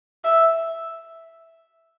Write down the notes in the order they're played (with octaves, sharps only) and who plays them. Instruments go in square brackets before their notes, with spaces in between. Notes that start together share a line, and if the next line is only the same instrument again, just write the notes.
[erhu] E5